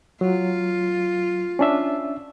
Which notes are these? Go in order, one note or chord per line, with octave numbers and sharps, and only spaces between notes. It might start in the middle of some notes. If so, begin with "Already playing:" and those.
F#3 F4
C#4 D4 E5